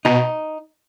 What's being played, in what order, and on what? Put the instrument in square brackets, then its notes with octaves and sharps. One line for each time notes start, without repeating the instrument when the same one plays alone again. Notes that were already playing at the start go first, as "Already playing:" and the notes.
[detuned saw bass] B2 [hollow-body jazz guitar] D#4